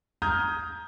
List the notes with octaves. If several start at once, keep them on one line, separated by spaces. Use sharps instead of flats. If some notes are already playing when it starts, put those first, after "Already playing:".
A#5 D#6 F6 G6 G#6